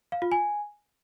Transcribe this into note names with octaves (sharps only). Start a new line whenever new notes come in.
F5
F4
G#5